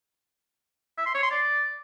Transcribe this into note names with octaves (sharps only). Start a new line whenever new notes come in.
E5
C6
C#5
C6
D5